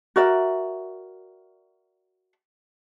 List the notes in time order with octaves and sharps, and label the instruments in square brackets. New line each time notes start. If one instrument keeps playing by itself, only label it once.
[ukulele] F#4 A#4 D5 E5